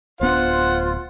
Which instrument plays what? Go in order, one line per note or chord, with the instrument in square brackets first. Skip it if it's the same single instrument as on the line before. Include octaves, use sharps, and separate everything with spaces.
[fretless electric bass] D1 B3 D4 [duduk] F4 [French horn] C5 [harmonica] F#5